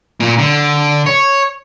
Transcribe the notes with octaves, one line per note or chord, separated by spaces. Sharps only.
A#2
D3
C#5